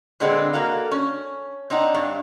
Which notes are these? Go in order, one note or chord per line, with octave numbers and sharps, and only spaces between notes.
A#2 D3 G#3 B3 C4
A#3 F#4 A4 F5
C#4
C4 D4 D#4 F#5
G2